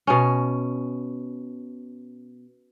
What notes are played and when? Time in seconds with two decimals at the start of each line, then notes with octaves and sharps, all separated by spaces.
0.07 B2 C#4